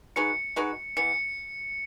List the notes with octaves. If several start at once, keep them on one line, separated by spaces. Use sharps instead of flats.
G#3 D#4 F#4 B4 C#7
G#3 D#4 F#4 B4
E3 B3 C#7